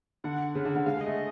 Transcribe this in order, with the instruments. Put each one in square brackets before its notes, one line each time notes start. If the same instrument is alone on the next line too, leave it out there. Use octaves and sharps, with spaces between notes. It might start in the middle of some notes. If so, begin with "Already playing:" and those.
[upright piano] D3 [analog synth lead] F#5
[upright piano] C#3
D3
D3
[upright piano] G#3 [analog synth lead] F5
[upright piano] G#3 [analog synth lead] D#5
[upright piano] A3